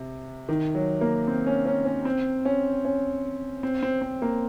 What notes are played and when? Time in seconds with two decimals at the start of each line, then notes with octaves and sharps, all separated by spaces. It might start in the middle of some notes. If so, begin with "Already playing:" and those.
Already playing: C3
0.49 D#3
0.75 F#3
1.01 A#3
1.28 C4
1.47 C#4
1.66 C#4
1.85 C#4
2.05 C4
2.45 C#4
2.85 C#4
3.63 C4
3.83 C4
4.02 C4
4.22 A#3